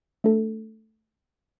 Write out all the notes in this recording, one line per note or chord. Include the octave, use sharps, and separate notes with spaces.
A3 D4 A4